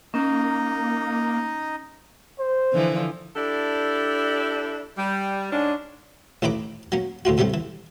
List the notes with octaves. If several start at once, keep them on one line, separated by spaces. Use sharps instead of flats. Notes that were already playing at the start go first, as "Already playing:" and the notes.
A#3 C#4 D#4 D#5
C5
D3 E3 F3
D4 E4 G4 A4 D5
G3
G#2 G#3 C#4 D4
A1 A2 E3 D#4 B4 D6
F#3 A#3 C#4
D2 A2 F4 F#4
A2 C3 G3 A3 B3
E3